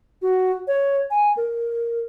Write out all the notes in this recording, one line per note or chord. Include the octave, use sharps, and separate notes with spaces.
F#4
C#5
G#5
A#4